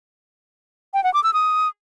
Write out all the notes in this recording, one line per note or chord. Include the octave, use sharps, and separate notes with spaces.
G5
F#5
D6
E6
D#6